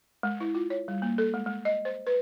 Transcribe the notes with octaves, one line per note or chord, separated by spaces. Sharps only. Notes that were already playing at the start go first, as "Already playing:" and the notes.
G#3
E4
F4
C#5
G3
A#3
A4
G#3
G#3
D#5
C5
B4